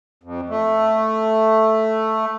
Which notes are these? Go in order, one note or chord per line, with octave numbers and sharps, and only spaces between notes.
F2
A3